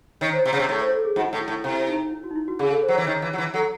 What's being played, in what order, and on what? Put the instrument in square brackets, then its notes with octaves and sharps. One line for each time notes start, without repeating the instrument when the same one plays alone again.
[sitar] D#3 [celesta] C#5
[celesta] C5
[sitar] C3
C#3
[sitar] C3 [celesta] C#5
[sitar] A2 [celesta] C#5
[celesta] C5
A4
G#4
[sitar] G#2 [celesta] F#4
[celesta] E4
[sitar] A2
[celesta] E4
[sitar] A2
[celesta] E4
[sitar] C3 [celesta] E4
[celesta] D#4
E4
F#4
D#4
E4
F#4
[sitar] C#3 [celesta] G#4
[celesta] A4
C5
[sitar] F#3
[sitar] E3 [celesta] C#5
[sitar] D#3
E3
F#3
E3
[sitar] F#3 [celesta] A4